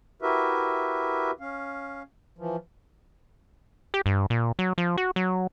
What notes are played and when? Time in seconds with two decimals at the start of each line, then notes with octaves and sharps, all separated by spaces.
0.22 E4 F#4 G4 A#4 B4 E5
1.40 C#4 F5
2.38 E3 F3
3.94 G4
4.06 G2
4.30 A#2
4.59 F#3
4.78 F3
4.97 F#4
5.16 F#3